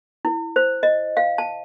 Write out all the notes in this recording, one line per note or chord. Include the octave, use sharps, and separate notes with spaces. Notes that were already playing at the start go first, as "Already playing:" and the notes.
E4
C5
D#5
F5
A5